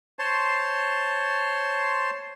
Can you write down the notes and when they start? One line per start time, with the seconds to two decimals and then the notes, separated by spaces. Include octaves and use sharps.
0.19 C5 C#5 A5 C6